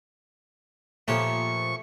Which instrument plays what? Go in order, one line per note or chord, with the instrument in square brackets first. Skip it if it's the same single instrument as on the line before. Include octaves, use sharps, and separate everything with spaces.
[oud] A#2 F3 [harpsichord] A3 G4 C#5 [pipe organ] C#6